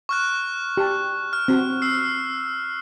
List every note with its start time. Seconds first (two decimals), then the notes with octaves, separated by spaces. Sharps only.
0.09 C#6 F6 F#6
0.77 G4 A5
1.33 F6
1.48 C4 F#4
1.82 E6 C7